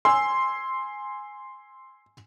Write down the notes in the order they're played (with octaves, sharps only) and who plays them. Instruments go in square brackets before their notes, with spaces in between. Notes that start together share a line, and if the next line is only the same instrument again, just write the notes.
[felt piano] G#5 E6 [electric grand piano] C6